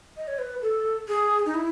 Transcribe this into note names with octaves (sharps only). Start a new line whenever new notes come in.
D#5
C#5
B4
A4
G#4
D#4
E4